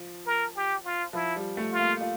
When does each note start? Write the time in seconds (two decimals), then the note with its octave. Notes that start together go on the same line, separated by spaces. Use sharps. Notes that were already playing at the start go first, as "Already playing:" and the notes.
Already playing: F3
0.26 A#4
0.56 G4
0.85 F4
1.13 F3 E4
1.36 G3
1.57 A3
1.73 F4
1.79 A#3
2.01 F4